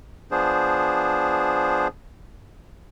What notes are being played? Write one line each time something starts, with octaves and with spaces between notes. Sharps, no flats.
F3 B3 D4 G#4 C5